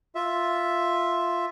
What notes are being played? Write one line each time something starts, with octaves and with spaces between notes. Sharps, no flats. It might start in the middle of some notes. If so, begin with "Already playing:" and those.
F4 E5